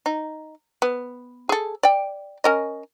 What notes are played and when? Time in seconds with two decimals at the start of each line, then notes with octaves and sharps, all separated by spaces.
0.06 D#4
0.82 B3
1.49 G#4 A4
1.83 D5 G5
2.44 C#4 A#4 D#5